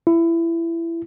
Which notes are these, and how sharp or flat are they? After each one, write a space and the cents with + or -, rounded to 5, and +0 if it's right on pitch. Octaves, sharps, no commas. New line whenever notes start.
E4 +20